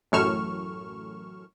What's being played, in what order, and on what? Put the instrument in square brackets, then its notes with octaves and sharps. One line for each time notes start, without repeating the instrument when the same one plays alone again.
[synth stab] A1 F#2 A2 C#6 F6 E7